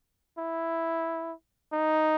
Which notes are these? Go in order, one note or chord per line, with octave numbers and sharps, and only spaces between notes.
E4
D#4